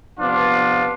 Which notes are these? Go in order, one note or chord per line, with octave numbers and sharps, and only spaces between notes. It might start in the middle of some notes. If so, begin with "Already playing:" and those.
C3 F3 B3 D4 F4